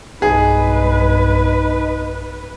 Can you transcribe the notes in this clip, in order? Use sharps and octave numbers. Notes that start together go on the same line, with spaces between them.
B1 G2 D#4 G#4 B4